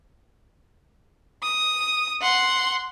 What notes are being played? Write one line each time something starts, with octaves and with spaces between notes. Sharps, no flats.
D#6
F#5 C6